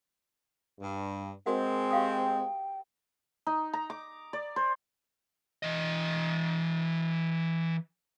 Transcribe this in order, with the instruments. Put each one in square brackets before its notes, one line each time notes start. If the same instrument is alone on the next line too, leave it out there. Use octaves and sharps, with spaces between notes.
[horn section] G2
[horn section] G#3 C4 [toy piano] F#4 A#4 F#5
[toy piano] G4 F5 D#6 [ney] G5
[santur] D#4
A#5
D6
D5
C5
[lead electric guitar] E3 D#5